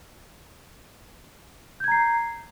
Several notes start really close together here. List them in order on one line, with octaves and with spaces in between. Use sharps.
G6 G#6 A#5 C7